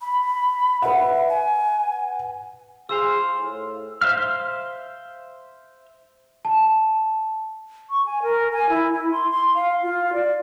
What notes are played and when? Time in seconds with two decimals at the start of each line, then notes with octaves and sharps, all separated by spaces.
0.01 B5
0.82 B4 E5 F#5
1.29 G#5
2.89 F4 G#4 C5 F5 E6
3.36 A2
4.01 C5 E5 F5 F6
6.45 A5
7.90 C#6
8.06 G#5
8.23 A#4
8.53 G#5
8.69 E4
8.93 E4
9.11 C6
9.30 C6
9.55 F5
9.83 F4
10.13 D5